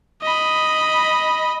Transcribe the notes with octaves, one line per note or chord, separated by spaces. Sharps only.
D#5 B5